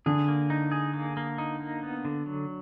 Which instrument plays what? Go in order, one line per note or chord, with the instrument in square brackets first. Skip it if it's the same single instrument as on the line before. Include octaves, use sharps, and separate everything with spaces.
[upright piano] D3 [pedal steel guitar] G#4
[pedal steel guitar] A#3
D#4
G#4
A#3
A#3
D#4
A#3
B3
D3
F#3